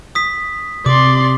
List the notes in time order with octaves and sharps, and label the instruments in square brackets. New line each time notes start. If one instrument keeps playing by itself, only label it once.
[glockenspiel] D#6 B6
[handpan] C3 [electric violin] D5 C6 [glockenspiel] D6